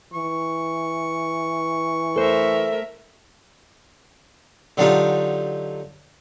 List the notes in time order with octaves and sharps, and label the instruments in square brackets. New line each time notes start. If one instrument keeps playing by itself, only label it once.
[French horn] E3 [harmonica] C#6
[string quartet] A3 A#4 E5 [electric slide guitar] A4 C5
[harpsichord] D3 F#3 D4 D#4 F4 G4